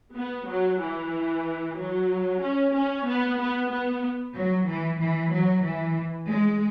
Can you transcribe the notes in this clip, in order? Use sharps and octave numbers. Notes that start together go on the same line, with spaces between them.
B3
F#3
E3
F#3
C#4
C#4
B3
B3
B3
F#3
E3
E3
F#3
E3
G#3